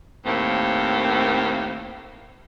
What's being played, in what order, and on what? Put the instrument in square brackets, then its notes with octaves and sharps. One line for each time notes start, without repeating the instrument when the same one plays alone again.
[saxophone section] D#2 A2 A#3 C4